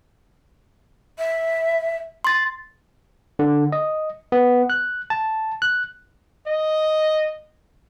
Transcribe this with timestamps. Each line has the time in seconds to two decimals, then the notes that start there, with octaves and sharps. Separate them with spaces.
1.18 E5
2.24 C6 A6
3.39 D3
3.72 D#5
4.32 B3
4.70 F#6
5.10 A5
5.62 F#6
6.47 D#5